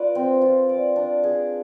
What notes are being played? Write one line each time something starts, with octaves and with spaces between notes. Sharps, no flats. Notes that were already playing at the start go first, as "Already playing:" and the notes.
Already playing: F4 B4 D5
C4
F4
D5
D4
G#4